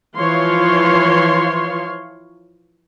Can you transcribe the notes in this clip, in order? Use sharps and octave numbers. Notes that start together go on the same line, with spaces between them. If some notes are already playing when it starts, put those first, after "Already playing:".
E3 F3 C#5 F5 C6